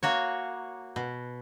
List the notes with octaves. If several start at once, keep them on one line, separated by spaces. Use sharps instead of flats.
A#3 F#4 C#5
B2